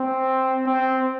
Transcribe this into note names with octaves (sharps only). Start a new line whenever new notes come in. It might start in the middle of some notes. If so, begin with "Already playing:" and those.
Already playing: C4
C4